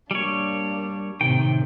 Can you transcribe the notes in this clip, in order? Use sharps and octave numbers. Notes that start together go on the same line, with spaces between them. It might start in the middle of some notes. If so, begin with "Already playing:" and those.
G3 A#3 D4 C#5
A2 C3 D#3 G5